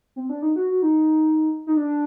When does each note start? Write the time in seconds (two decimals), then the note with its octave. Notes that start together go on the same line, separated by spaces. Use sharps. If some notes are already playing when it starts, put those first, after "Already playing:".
0.16 C4
0.29 D4
0.42 D#4
0.56 F#4
0.69 F#4
0.82 D#4
1.67 D#4
1.77 D4